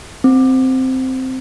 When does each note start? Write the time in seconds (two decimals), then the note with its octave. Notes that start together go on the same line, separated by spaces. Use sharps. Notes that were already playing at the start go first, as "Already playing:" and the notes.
0.24 C4